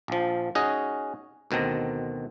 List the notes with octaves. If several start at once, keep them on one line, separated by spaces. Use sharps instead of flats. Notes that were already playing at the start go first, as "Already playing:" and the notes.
A#1 F3
C#4 D#4 F#4 G#4 D#5
D2 B2 D#3 C4 A#5